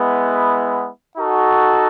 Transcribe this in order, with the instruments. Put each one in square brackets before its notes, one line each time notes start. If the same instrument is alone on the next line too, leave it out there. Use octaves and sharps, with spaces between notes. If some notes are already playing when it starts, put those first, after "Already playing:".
Already playing: [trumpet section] G#3 B3 E4
D#4 F#4 A4